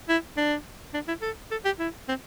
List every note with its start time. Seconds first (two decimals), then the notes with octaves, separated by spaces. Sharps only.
0.08 E4
0.37 D4
0.94 D4
1.08 E4
1.22 A4
1.51 A4
1.65 G4
1.79 E4
2.08 C4